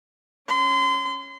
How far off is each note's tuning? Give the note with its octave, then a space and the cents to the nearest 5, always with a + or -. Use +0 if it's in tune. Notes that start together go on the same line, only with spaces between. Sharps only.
C#4 -5 C6 -30